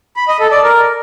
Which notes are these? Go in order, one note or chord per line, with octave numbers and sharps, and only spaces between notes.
B5
D#5
A4
D5
A#4